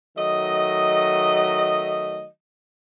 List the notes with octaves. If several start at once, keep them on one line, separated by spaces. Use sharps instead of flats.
D#3 F#3 A3 D#5